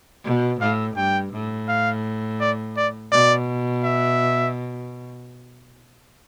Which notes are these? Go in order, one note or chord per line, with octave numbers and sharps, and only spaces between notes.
B2
A2 F5
G2 G5
A2
F5
D5
D5
B2 D5
E5